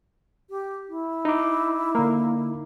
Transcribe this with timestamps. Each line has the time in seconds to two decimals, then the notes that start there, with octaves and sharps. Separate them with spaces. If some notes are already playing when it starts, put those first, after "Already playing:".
0.50 G4
0.89 E4
1.25 D#4 D6
1.95 D3 A#3